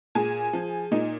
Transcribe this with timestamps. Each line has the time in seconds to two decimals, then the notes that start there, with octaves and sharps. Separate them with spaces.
0.15 A#2 G#4 G#5
0.53 F3
0.91 A#2 D#4 D#5